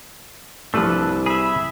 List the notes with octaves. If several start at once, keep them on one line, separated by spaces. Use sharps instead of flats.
C2 G2 F3 A3 D4 A4 B4
G#4 E5 B5